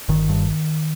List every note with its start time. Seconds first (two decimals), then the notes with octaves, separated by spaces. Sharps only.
0.09 G1 D#3
0.29 G2